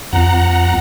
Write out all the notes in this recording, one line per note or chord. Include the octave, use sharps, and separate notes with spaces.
F2 F#5 A#5